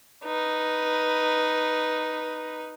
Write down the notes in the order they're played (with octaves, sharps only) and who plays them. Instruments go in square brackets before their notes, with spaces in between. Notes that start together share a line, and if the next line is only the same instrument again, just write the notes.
[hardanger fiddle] D#4 B4